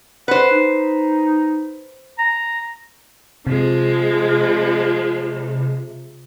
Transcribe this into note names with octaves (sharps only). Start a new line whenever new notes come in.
B4 C5 F#5
D#4
A#5
C3 F3 G#3